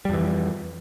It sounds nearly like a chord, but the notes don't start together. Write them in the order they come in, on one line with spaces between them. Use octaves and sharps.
G3 F2 E3